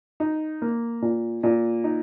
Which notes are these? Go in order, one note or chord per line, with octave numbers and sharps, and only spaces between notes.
D#4
A#3
A#2
A#2
D#4